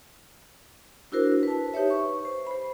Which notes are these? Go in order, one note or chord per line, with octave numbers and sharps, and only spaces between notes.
D4 E4 F#4 A#4 C5
B4 A5
D#4 G4 B4 C#5 E5
C#6
C5
C5 B5